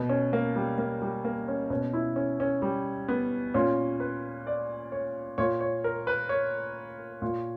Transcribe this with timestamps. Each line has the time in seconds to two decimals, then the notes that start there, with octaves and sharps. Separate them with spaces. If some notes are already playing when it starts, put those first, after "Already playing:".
Already playing: B2
0.09 C#4
0.33 A#3
0.56 G3
0.78 A#3
1.02 G3
1.25 A#3
1.48 C#4
1.70 B2 C#4
1.93 E4
2.16 C#4
2.40 C#4
2.62 G3
3.08 B3
3.54 A#2 C#4
4.00 B4
4.47 D5
4.92 C#5
5.38 A#2 C#5
5.61 C#5
5.84 A#4
6.07 B4
6.29 C#5
7.22 A#2